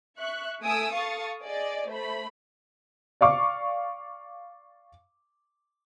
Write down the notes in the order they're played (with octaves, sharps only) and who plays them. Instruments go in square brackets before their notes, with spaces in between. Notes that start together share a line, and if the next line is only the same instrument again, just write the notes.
[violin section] E5 C#6 F#6
A3 G#5 D#6 E6 D7
A4 F5 C#6 D#6 A6 C#7
G#4 D5 D#5
A3 C5 B5
[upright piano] D5 F5 C#6 D6